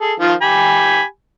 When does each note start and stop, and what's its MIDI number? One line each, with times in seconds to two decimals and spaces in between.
0.01 0.13 68
0.01 0.13 69
0.20 0.34 51
0.20 0.34 53
0.20 0.34 65
0.42 1.03 67
0.42 1.03 80
0.42 1.03 83